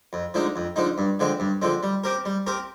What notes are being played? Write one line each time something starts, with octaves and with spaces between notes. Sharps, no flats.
F2
D3 F3 G#3 D#4
F2
D3 F3 G#3 D#4
G2
D3 F3 G#3 C4
G2
D3 F3 G#3 C4
G3
C4 G4 A#4
G3
C4 G4 A#4